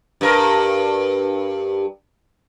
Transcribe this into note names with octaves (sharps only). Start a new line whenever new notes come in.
G2 A#4